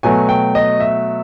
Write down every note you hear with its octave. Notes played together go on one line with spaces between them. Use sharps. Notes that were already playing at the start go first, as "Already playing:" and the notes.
B2 F#3 A3 G#5
G5
D#5
E5